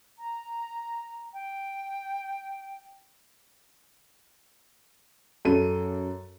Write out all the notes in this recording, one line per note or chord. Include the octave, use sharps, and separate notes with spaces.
A#5
G5
F#2 A4 D#7